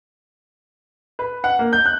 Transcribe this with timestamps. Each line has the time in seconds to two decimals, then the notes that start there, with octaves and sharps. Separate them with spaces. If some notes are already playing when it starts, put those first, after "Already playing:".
1.19 B4
1.44 F#5
1.59 A#3
1.73 G6
1.86 F#6